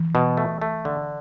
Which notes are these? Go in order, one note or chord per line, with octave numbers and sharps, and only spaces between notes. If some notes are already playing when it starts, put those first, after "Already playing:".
Already playing: E3
B2
A3
A3
D3